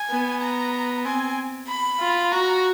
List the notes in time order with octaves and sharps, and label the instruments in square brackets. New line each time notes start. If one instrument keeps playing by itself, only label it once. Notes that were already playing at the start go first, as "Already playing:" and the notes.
Already playing: [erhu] G#5
[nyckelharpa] B3
[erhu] A#5
[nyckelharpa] C4 [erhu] G#5
[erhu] B5
[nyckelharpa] F4
[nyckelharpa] F#4 [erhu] A#5